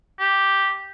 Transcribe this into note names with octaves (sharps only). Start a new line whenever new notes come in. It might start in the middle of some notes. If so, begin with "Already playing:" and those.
G4